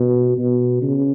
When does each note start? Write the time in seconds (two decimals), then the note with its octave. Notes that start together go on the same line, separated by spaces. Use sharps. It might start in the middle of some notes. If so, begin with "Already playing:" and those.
Already playing: B2
0.38 B2
0.82 C#3